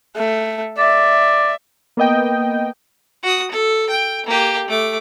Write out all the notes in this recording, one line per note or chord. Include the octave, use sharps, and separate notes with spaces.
A3
D5 E5
A#3 B3 D#5 G5
F#4 D#6
A4
G5
A#3 G4
A3 D6